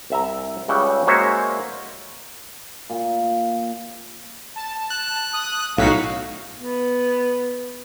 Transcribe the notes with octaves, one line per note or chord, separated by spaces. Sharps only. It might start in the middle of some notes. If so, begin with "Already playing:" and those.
C2 E5 A#5
C#2 C#3 G3 E5 F#5 G5
G#3 A#3 F#4 C5 C#5 E5
A#2
A5
F#6
D#6
B1 A2 D#4 F#4 F5 B6
B3